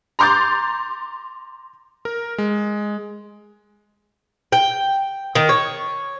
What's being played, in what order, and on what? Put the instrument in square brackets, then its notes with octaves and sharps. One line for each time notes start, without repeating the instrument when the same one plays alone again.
[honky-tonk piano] A#5 C6 D6 G6 A6
[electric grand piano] A#4
G#3
[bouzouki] G5
D#3
C#5